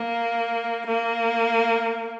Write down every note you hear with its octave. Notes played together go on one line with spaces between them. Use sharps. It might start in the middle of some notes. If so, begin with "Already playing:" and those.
Already playing: A#3
A#3